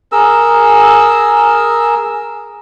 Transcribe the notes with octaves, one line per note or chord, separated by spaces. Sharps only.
G#4 A#4 E6